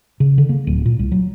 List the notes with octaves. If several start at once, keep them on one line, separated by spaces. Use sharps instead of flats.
C#3
D3
A#3
D1
A#2
C2
F#3